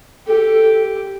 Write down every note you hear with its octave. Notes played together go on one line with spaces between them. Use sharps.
G4 A4